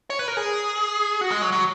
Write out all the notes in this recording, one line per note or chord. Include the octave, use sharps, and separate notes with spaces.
C#5
B4
A#4
G#4
F#4
G#3
F#3
F#3